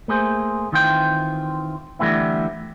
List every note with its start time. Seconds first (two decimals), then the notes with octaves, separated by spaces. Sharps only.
0.08 A3 A#3 G#4 C5
0.72 D#3 E3 C4 F4 G5
1.99 D3 E3 G3 A3 B3 E4